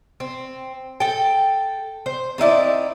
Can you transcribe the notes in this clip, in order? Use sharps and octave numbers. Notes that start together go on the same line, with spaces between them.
C4
A4 G5
C5
C4 D#4 E4 D5